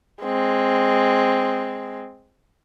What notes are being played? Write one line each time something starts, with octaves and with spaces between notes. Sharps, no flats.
G#3 C4